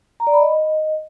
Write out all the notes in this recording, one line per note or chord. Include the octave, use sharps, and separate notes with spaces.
A#5
D5
B5
D#5